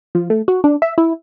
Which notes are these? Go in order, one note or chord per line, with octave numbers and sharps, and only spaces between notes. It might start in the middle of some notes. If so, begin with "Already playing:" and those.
F3
A3
F#4
D4
E5
E4